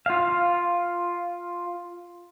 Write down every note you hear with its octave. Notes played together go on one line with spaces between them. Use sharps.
F4 F5